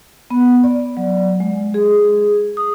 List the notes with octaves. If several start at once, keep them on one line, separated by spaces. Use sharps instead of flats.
B3
D5
F#3
G#3
G#4
D#6